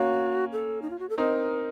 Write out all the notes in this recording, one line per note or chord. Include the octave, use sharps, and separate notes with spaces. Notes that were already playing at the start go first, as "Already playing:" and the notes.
Already playing: A#3 C#4 F#4
A4
D#4
F4
F#4
A4
C4 D#4 A#4